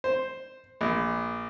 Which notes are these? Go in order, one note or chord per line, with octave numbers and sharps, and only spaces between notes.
C5
A#1